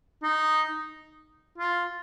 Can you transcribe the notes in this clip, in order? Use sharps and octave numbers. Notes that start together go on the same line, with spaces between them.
D#4
F4